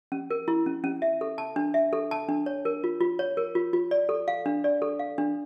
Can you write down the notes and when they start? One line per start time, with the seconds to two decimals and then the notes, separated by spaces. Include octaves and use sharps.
0.12 C#4
0.31 A#4
0.48 E4
0.66 C#4
0.84 C#4
1.02 E5
1.21 A4
1.38 A5
1.56 D4
1.74 E5
1.93 A4
2.11 A5
2.29 D4
2.46 C#5
2.65 A#4
2.84 F4
3.01 F4
3.19 C#5
3.37 A#4
3.55 F4
3.73 F4
3.91 D5
4.09 A4
4.28 F5
4.46 D4
4.64 D5
4.82 A4
4.99 F5
5.18 D4